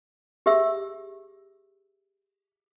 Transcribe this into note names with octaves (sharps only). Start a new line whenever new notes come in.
G4 G#4 E5 E6